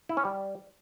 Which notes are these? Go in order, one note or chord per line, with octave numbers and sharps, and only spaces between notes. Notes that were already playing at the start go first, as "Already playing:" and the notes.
E4
C#4
G3